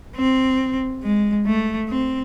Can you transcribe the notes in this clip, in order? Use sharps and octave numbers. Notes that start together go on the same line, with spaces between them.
C4
G#3
A3
C4